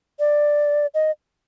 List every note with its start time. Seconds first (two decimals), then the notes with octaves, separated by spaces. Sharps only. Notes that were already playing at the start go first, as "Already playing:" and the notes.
0.19 D5
0.94 D#5